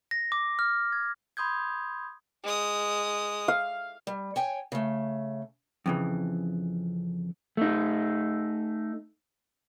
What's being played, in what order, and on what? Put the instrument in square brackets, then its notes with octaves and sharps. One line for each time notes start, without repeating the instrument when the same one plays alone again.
[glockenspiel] A#6
D6
F6
G#6
[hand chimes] B5 C6 D#6 G6 G#6
[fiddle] G#3 D#6
[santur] F5
[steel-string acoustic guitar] G3
C#5 G5 G#5
C#3 A3
[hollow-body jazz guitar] F2 C#3 E3
[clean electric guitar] A3 D#4